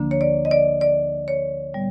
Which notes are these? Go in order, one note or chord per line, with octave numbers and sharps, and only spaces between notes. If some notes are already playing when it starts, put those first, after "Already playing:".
Already playing: D2 D3 F3 A#3 D4
C#5
D5
D#5
D5
D5
C#5
A#2 G3 B3